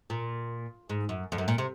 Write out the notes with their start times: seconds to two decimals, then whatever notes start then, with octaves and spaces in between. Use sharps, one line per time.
0.10 A#2
0.89 G#2
1.09 F#2
1.32 F2
1.38 F#2
1.48 A#2
1.58 C3